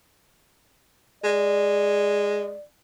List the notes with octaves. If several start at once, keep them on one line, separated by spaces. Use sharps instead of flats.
G#3 D5